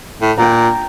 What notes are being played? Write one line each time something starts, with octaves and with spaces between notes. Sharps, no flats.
A2
A#2 G5 A#5